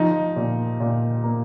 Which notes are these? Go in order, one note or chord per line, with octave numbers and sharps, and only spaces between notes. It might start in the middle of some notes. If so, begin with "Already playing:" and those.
Already playing: F3 D#4
A#2
A#2
A#3